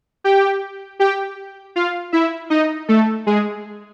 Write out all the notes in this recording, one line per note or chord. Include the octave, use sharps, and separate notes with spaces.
G4 G5
G4 G5
F4 F5
E4 E5
D#4 D#5
A3 A4
G#3 G#4